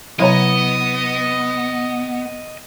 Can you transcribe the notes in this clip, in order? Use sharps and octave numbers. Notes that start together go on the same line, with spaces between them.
C3 F#3 B3 E4 C#5 D#5 A#5